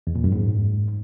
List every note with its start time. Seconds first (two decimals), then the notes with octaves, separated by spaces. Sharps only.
0.07 E2
0.15 A#2
0.24 F#2
0.32 G#2